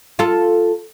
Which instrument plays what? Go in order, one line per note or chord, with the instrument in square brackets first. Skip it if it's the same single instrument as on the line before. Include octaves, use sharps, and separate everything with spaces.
[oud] F4 A4